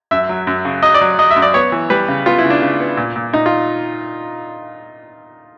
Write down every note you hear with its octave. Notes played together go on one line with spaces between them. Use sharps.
F#2 E5
F#3
F#2
C#3
F#3 D#5
D5
F#3
F#3 D#5
E5
F#2
D5
B3 C#5
E3
G3 B4
C#3
B3 F4
E4
C#3
D4
C#3
B3
A#2
A#2
A#2 D#4
F4